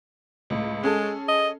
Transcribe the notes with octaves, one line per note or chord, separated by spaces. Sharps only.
C#2 A2
G#3 C#4 G#4 A4
D#5